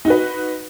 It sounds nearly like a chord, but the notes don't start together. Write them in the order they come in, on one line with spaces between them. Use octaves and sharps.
D#4 F#4 B4